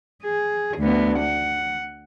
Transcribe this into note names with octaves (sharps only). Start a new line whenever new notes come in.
G#4
D2 B3
F#5